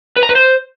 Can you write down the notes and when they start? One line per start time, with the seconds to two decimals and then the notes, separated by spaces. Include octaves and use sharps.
0.16 B4
0.23 A#5
0.29 B4
0.35 C5